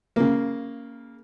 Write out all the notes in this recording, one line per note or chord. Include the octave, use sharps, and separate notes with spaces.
C#3 A#3